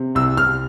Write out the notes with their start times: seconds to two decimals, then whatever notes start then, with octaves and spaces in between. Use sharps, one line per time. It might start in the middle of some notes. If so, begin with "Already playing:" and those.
Already playing: C3
0.15 C2 E6
0.37 C2 F6